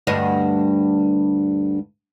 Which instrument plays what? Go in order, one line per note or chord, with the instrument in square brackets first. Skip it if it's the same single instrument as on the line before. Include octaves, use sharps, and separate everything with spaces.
[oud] D2 G2 D#5